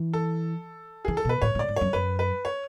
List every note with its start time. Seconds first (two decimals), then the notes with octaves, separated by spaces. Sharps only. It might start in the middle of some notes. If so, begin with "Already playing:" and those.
Already playing: E3
0.13 A4
1.05 E3 G#4
1.17 A4
1.25 B2 B4
1.42 A2 C#5
1.55 A2
1.59 D5
1.68 G#2
1.76 F#2 C#5
1.93 F#2 B4
2.19 B4
2.45 C#5